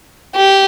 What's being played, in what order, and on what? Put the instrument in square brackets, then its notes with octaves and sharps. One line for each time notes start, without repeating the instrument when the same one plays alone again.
[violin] G4